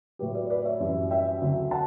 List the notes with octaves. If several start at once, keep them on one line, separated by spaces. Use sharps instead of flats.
A2 F#3 G4 B4
B4 D5
B4 D5
C#5 E5
F#2 E3 G3
E5 G5
D2 D3 F#3
F#5 A5